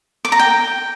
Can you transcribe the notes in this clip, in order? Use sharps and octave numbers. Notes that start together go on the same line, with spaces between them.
D6
A#5
G5